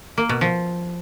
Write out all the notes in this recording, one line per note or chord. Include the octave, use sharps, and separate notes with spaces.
A#3
B2
F3